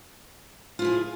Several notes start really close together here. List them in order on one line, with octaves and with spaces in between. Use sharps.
F4 E4 G#4